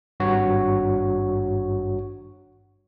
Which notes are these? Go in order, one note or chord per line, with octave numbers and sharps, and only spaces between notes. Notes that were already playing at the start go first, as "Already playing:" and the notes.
G#1 G2 F#4 C#5